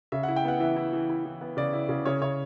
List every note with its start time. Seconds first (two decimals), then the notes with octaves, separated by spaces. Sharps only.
0.12 C#3 E5
0.23 E4 F#5
0.36 G5
0.45 B3 F#5
0.60 E3 E5
0.77 E4
0.93 E3
1.09 E4
1.25 E3
1.41 B3
1.57 C#3 D5
1.73 E4
1.89 C#3
2.06 C#3 C#5
2.21 C#3 C#5